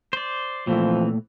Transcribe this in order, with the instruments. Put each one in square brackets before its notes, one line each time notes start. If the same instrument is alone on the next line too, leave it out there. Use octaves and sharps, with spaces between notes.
[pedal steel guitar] C5 D5
[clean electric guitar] A#2 A3 [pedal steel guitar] E3 C4 [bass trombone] F3